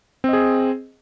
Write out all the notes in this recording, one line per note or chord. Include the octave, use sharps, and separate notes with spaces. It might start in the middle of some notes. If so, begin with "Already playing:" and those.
C4 G#4 D#5